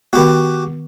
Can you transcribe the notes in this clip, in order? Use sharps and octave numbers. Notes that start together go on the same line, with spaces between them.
D#3 B3 F#4 G4